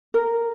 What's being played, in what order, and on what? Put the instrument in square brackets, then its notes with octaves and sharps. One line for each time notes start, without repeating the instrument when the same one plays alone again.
[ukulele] A#4